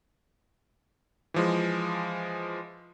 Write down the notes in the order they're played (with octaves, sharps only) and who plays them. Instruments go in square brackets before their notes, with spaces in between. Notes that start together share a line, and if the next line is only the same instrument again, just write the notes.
[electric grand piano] E3 F3 G#3